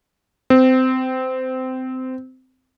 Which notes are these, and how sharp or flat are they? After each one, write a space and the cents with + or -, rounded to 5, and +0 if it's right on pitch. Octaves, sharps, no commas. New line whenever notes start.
C4 -20